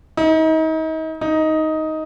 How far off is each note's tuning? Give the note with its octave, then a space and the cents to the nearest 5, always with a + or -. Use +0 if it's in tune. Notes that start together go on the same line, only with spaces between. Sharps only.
D#4 +35
D#4 +10